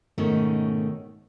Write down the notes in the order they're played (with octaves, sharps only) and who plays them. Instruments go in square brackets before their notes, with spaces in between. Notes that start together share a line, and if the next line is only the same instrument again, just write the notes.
[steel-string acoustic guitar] G#2 B2 D#3 A3 C#4 D#4